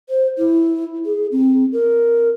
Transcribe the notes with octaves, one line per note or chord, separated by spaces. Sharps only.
C5
E4
G#4
C4
A#4